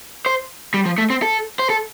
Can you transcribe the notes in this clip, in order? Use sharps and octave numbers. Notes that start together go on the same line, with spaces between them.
C5
G3
F3
A3
C4
A4
C5
A4